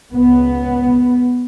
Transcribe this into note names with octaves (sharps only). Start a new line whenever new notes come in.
C#2 C#3 B3